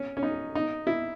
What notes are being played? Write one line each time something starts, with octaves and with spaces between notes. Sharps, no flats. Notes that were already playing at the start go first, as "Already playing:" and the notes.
Already playing: C#4
C#4
D#4
D#4
E4